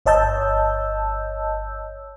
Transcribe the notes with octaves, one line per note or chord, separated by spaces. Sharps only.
G1 C#5 D#5 A5 E6 G6